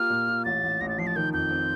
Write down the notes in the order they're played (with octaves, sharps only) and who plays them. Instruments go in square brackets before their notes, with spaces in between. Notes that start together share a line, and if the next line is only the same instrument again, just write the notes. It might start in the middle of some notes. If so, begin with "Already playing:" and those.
Already playing: [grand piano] A#3 F4 G4 [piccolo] F6
[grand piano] A#2
F4
[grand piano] A1 [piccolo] A6
[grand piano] A1
[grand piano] A1 [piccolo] A#6
[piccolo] A6
[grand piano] F3 [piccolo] C7
[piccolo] A6
[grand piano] D#3 [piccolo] G6
[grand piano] F2 [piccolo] G6
[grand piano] C4